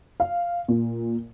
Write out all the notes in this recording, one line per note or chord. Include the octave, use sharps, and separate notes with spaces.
F5
A#2